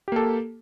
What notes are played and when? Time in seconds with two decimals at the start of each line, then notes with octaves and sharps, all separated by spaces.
0.08 G4
0.12 A#3
0.16 A4